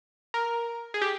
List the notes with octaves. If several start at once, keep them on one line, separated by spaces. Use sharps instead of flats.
A#4
G#4
G4